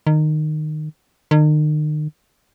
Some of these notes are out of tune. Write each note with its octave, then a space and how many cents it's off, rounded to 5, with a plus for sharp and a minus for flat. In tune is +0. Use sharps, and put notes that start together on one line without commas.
D#3 -20
D#3 -40